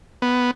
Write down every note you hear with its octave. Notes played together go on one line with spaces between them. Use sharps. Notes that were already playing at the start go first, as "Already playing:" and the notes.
B3